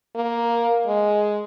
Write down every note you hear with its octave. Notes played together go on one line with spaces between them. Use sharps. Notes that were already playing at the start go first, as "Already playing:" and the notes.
A#3
G#3